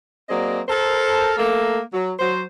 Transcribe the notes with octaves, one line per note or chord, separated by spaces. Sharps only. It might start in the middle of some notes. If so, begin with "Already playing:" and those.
F#3 A#3 C4 G#4 D5 D#5
A4 A#4 C5
A3 A#3 A4
F#3
F#3 C5